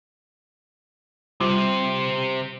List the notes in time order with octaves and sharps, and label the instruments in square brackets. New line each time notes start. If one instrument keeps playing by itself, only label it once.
[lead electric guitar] C3 C4 [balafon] G3 F4 C5